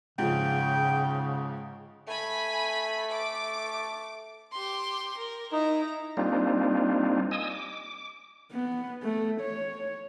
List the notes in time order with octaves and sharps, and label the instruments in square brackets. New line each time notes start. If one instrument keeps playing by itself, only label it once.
[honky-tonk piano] G#2 F3 [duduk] C#3 [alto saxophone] G5
[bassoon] A3 [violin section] G#5 B5
[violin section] D6
[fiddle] G4 C6
A#4
[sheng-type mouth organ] D#4 [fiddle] E4 A#5
[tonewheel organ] G3 A#3 C4 D4 D#4 F4
D#5 G#5 D#6 E6
D6
[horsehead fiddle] B3
A3
C#5